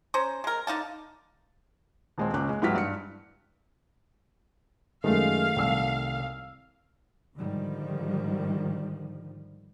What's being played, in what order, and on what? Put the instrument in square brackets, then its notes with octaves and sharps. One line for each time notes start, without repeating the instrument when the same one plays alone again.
[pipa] C#4 C5 A#5
G#3 A#4
D3 D#4 F5 A5
[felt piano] D#1 G#3 C4
C#2 C#4 D6 F#6
G#3
G#2 E3 F#3 G4 F6 B6
G2 C#7
[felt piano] F#2 G#3 [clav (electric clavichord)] D#3 A3 [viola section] F5
[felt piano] C2 E6
[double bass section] G#2 D3 D#3 F3 G3